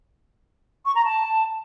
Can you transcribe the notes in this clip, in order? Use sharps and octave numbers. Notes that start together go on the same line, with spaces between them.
C#6
A#5
A5